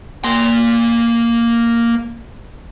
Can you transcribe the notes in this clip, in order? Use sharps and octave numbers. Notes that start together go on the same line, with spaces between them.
A#3 C6